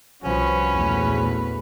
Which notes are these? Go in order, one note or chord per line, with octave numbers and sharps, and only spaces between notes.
C2 F3 C#4 F#4 B4
A#1 E2 A3